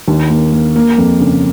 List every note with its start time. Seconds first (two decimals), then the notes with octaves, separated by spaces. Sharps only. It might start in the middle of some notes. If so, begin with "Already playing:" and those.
0.08 D#2
0.30 A#3
0.52 A#3
0.76 A#3
0.98 F2
1.20 C#3